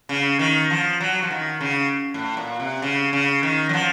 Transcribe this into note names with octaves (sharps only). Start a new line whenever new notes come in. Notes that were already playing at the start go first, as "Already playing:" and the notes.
C#3
D#3
F3
F#3
F3
D#3
C#3
A2
A#2
C3
C#3
C#3
D#3
F#3
F3